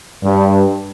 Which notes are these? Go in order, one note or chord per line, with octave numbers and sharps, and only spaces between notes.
G2